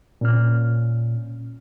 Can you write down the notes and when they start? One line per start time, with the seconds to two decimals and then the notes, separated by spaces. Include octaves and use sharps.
0.21 A#2 C#4 F6